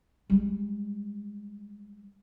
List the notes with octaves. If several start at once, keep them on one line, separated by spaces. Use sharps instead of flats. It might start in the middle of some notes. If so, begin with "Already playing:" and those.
G3 G#3